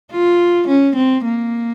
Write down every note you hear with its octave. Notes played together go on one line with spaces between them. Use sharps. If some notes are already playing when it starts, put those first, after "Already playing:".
F4
C#4
C4
A#3